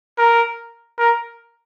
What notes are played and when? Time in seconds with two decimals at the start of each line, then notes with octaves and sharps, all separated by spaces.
0.18 A#4
0.98 A#4